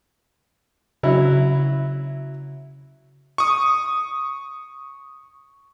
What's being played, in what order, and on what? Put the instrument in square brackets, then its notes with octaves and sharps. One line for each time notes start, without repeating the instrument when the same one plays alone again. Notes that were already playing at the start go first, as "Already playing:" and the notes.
[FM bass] C#3 [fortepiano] F#3 E4
[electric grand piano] C#6 D#6